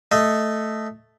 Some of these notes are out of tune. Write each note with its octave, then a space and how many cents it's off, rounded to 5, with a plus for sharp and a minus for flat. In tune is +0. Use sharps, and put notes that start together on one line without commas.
A3 +0 D#5 +0